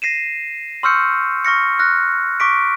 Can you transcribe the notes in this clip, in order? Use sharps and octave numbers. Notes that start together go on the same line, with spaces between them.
A#6 C7 D#7 E7
C6 C#6 E6 F6 G6 C#7
C#6 F6 A#6 C#7
F6 F#6 A#6
C#6 D6 B6 D7